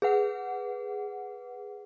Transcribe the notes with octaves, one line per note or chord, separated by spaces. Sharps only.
G#4 B4 F#5